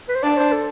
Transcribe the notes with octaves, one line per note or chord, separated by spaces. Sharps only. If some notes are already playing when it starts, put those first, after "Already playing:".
B4
C5
D4 D5
C5
A4